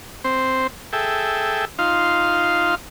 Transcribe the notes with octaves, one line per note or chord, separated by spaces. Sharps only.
C4 C5
G#4 A4 E5 G5
D#4 F4 F5 C6